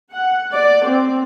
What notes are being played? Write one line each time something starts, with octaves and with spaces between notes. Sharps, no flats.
F#5
D5
C4